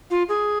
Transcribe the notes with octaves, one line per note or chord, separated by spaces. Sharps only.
F4
G#4